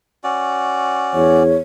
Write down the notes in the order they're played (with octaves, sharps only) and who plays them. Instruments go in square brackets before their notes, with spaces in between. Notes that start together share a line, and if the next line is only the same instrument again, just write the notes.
[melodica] C#4 F#4 D5
[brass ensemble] E2 [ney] C#5